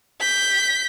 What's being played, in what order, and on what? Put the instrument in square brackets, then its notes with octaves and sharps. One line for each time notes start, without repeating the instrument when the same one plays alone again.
[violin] G6 B6